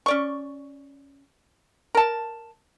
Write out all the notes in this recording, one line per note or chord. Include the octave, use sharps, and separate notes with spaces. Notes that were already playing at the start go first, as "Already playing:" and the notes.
C#4 D5 C#6
A#4 A5